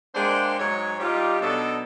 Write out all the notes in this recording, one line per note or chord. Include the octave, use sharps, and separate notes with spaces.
G#3 A#3 D4 C5 F#5 G5
G#2 F#3 G#3 C#5
G3 D#4 F4 G4
B2 F#3 D4 D#4 A4